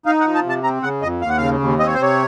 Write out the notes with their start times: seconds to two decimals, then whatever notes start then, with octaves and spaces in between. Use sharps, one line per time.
0.06 D#4 F5
0.20 F#5
0.25 F3
0.35 A5
0.44 C3
0.49 A5
0.63 C4 A#5
0.83 C#3 F#5
1.02 F2 D#5
1.21 D#2 F5
1.29 F#5
1.37 C#3 F5
1.60 D#2
1.79 C4 D#5
1.87 C#5
1.94 C5
1.98 C3 C#5